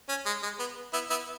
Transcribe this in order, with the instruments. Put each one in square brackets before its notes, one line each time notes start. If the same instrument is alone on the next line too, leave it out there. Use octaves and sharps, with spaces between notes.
[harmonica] C#4
G#3
G#3
B3
B3 E4
B3 E4